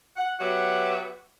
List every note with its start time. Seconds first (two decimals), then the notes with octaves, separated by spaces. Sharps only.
0.17 F#5
0.40 F#3 B3 F#4 G4 E5 F#5